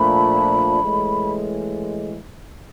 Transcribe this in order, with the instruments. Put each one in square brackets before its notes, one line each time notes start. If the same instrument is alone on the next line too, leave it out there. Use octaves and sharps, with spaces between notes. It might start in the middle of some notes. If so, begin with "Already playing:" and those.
Already playing: [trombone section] A#2 F3 A3 D4 [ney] B5
[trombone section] A1 A2 E3 G#3